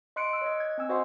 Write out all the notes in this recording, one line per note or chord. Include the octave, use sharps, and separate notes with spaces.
D#5 C6 F#6 C#7 D7
E6 F#6
C#5 D#5
G#6
C4 G#5 E6
F#4 C5 D#5 F#5 G#5 C6